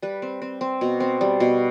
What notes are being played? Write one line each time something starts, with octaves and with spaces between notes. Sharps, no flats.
G3 B4
C4
C4
C4
B2
C4
G3
B2